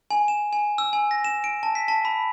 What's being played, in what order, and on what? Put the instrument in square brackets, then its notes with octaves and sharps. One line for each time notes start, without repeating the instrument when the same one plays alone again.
[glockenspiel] G#5
E7
G#5
E6
G#5
A#6
E7
D7
A5
B6
A5
B5